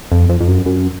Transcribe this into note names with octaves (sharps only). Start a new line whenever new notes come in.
F2
F2
F2
F#2
F#2